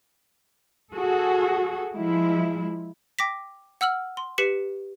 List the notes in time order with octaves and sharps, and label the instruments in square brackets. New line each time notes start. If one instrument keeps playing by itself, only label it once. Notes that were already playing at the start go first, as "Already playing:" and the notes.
[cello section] F#4 G#4 A4
F3 G#3 E4
[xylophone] G5 D6 A#6 B6
F#5 E6 F6 F#7
C6
G4 B4 B6 C#7 F#7